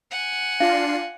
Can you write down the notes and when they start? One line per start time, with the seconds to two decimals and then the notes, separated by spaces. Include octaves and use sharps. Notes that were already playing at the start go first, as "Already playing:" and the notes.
0.11 F#5 G#5
0.60 D4 F4 F5 C7